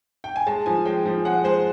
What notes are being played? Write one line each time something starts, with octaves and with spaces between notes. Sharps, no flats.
G5
G#5
G#3 A5
F3 G#5
G#3 G5
F3
G#3 F#5
G#3 C5